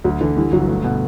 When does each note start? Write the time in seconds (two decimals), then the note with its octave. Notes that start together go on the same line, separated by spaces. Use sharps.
0.04 D2 F#3
0.21 D3 E3
0.37 E3 G3
0.52 G1 F#3
0.68 A3
0.84 B2